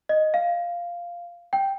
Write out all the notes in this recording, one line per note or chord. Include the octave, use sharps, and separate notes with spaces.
D#5
F5
G5